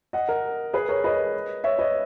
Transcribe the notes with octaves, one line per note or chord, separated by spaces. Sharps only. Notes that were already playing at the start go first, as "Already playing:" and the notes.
D#5 F#5
A#4
G#4 B4
A#4 C#5
B4 D#5
C#5 E5
B4 D#5